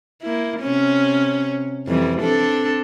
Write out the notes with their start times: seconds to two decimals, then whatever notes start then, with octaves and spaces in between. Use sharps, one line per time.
0.23 A#3 E4
0.60 C3 C#4
1.87 F2 E3 G3
2.20 C4 D4 A4